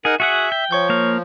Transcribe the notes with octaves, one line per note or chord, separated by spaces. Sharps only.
D#4 G#4 A#4 F#5
F#4 G#4 E5 F#5
G5
F3 C#5 C#6 G6
A#3 F5